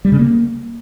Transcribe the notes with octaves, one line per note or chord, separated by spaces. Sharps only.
G3
C#3
A#3